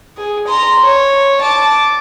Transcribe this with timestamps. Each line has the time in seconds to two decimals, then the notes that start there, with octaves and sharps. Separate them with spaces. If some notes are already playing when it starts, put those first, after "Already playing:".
0.17 G#4
0.49 A#5 C6
0.80 C#5
1.42 A5 D6